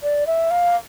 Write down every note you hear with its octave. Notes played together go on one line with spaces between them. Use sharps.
D5
E5
F5